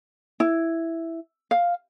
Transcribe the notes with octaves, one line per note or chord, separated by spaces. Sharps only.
E4
F5